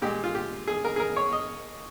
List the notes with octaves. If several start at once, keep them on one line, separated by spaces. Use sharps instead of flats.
A#2 G#3 G4
F4
G4
G#4
A#4
G#4
A#4
C#5
D#5